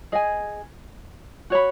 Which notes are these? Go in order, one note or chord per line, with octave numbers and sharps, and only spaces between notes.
G#4 D#5 G#5
F#4 C#5 B5